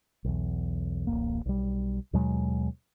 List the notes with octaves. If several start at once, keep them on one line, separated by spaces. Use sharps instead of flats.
B1 E2
D1 A1 E2 A#3
B1 G3
D#2 B2 F#3 G#3